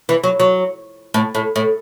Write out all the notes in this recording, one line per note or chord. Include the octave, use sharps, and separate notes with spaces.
E3
F#3
F#3
A2
A2
A2